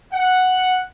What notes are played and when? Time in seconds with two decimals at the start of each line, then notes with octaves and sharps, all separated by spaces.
0.12 F#5